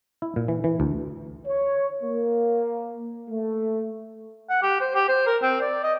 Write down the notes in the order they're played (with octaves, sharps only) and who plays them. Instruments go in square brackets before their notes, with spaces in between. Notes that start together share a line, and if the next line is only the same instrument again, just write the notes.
[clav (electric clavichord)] E4
A#2
E3
E3
D2
[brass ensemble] C#5
A#3
A3
[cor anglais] F#5
G4
C5
G4
C5
A#4
C4
D5
D#5